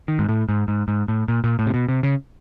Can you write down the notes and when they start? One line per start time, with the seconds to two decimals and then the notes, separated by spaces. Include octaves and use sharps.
0.08 D#3
0.19 G#2
0.29 A2
0.49 G#2
0.68 G#2
0.88 G#2
1.08 A2
1.28 A#2
1.44 A#2
1.59 A2
1.67 C3
1.74 B2
1.89 C3
2.03 C#3